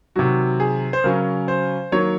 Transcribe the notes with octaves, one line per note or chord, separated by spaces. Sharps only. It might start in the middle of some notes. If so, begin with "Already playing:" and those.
C3 D#3 F#3 F#4
G#4
C5
C#3 F#3 C#4 A#4
C5
D#3 F#3 A#3 C#5